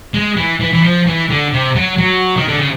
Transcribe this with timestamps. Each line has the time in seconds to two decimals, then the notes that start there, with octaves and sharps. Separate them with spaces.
0.14 G#3
0.37 E3
0.60 E3
0.72 E3
0.83 F3
1.07 E3
1.30 D3
1.53 C3
1.76 F#3
1.98 F#3
2.37 D#3
2.48 D3
2.57 C#3